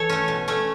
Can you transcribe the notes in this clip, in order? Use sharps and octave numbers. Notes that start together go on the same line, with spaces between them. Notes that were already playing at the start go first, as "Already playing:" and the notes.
Already playing: E3 A4 C#5
A3 C#4
B2
A3 C#4